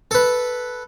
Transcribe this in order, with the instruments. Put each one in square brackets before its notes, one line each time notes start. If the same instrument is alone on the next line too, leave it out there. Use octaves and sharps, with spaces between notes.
[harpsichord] A4 B4